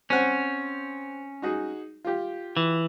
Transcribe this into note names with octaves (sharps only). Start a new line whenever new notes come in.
C4 C#4 C5 F#5
D#4 F#4 G#4
F4 G4
E3